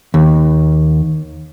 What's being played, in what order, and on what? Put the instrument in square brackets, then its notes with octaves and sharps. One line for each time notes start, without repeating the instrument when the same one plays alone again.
[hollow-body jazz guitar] D#2